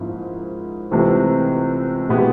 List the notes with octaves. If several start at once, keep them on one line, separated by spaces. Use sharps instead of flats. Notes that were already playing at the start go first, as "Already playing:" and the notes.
Already playing: G#2 F3 A#3 C#4 E4
C#2 C3 E3 A3 C4
B2 G#3 B3 E4 G4